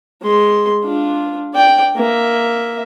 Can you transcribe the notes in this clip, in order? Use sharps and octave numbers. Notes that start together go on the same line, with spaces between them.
G#3 C6
D4 F4
D5 G5
A#3 E5